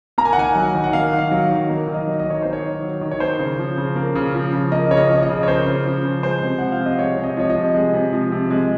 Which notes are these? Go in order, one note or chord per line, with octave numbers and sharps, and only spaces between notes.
A#3 A#5
G#5
F#5
D#3 G#5
F#3
D#3
F#5
A#3 F5
D#3
F5
F#3
D#3
A#3
D#3
D#5
F#3
D#5
D#3 C#5
A#3 C5
C#5
D#3
F#3
D#3
C#5
A#3 C5
C#3
F3
C#3
A#3
C#3
F3
C#3
A#3 D#5
C#3 C#5
D#5
F3
D#5
C#3
C#5
A#3 C5
C#3
F3
C#3
G#3 C5
C3
F3 F#5
F5
C3
D#5
G#3 C#5
C3
D#5
F3 C#5
D#5
C3
G#3
C3
F3
C3
G#3